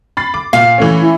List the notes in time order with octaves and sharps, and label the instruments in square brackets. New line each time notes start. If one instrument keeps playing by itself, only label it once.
[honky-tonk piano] B5 A6 C7
D6
[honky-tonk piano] A#2 [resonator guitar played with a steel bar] F5
[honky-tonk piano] E3 A3 C#4
[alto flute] E4